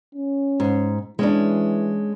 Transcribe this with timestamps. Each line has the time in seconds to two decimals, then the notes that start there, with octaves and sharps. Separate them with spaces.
0.15 C#4
0.60 G#2
1.19 E3 G#3 C#4 D4